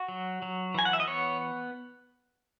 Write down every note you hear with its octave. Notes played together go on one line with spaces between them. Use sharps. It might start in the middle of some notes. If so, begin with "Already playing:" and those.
Already playing: F#4
F#3
F#3
E3 G#5
F#5
E5
D#5
B3 C#5